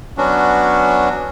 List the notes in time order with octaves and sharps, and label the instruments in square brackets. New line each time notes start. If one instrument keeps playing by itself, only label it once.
[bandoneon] F#3 B3 C#4 D4 F#4